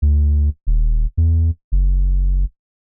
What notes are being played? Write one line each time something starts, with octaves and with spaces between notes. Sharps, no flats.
D2
D#1
E2
F#1